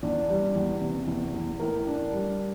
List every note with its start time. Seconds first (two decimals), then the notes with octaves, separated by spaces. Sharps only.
0.02 E2 D4 D5
0.30 G3
0.56 E2
0.81 C3
1.08 E2
1.34 E2
1.60 A2 A#4
1.87 D4
2.13 G3